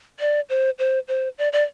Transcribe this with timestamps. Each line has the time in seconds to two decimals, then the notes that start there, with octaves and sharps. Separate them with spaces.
0.20 D5
0.50 C5
0.79 C5
1.08 C5
1.38 D5
1.53 D5